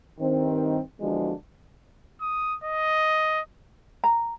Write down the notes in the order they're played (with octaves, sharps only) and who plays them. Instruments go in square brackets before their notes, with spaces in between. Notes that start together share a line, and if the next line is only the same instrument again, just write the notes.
[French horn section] G2 D#3 C4
E2 D3 F3 G#3 D4 F#4
[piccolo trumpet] D#6
D#5
[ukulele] A#5